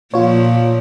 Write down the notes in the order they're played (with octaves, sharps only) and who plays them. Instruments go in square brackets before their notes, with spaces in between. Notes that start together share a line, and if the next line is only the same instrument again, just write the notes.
[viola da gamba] A#2 F3 [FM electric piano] F4 C#5